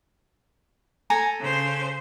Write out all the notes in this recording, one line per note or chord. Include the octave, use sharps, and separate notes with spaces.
A4 G#5 A#5
C#3 C5